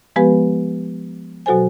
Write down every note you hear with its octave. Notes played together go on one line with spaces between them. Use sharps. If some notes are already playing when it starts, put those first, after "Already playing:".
F3 G#3 B3 G4 B4
B2 F#3 F#4 A4 C5 G#5